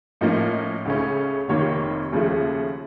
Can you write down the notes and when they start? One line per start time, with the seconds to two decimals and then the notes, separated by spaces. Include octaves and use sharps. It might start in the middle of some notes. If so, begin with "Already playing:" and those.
0.21 A2 F3 A#3 C#4 D#5
0.85 C#2 C#3 A3 C#4
1.48 F1 F2 C3 D#3 A#3 C#5
2.12 D#2 C#3 F3 A3